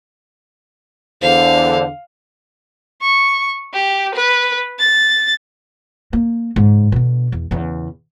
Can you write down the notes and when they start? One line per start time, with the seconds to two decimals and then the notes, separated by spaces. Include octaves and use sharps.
1.22 E2 D3 C5 F5
3.01 C#6
3.73 G4
4.15 B4
4.79 A6
6.13 A#3
6.56 G#2 C#3
6.92 B2 D3
7.32 E2
7.51 E2 C#3